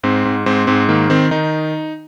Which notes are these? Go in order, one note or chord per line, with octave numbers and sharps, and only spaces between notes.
G#2 C4
G#2
G#2 C4
G#2 C4
D#3 A#3
D#3 C4
D#3 D#4